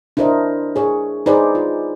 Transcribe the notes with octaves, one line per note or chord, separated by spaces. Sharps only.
D4 E4 A#4 C5 D#5
G#4 C#5
D#4 G#4 B4 C5 D5
F4